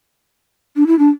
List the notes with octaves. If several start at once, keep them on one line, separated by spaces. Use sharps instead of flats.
D4
E4
D4